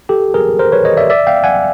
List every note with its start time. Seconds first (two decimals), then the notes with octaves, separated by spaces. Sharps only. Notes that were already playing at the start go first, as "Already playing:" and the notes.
0.09 G4 A4
0.34 G#4 A#4
0.59 A#4 C5
0.72 B4 C#5
0.85 C#5 D#5
0.97 D5 E5
1.10 D5 E5
1.27 F5 G5
1.44 F#5 G#5